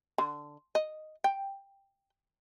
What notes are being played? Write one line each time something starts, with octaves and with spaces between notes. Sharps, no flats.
D3
D#5
G5